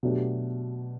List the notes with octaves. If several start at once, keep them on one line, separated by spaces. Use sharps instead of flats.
B2 F#3 A3 D4 G4